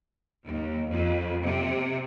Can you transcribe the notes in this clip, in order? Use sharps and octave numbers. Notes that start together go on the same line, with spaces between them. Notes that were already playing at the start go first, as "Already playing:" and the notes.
D#2
F2
C3